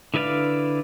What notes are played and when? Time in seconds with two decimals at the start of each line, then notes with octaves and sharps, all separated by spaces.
0.14 D3 E4 B4 D5 F5